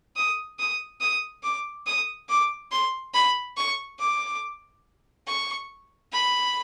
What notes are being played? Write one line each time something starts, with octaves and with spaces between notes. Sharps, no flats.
D#6
D#6
D#6
D6
D#6
D6
C6
B5
C#6
D6
C#6
B5